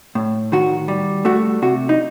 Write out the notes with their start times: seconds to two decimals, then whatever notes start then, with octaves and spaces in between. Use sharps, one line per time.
0.15 A2
0.52 D#3 F#4
0.88 G3
1.25 A3 F#4
1.62 C3 F#4
1.89 D#4